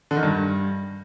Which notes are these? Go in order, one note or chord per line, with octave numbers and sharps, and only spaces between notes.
D3
D#3
G2